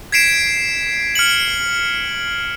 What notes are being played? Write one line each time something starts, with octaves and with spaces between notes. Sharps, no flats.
G#6 B6 C7 D7 E7
F6 C#7 D7 F#7